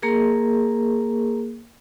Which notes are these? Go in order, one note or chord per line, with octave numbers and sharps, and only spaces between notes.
A#3 G#4 A#4